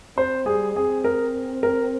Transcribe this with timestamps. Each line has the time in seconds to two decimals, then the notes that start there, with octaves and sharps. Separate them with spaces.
0.17 C4 C5
0.46 G3 G#4
0.75 C4 G#4
1.04 A#4
1.63 A#4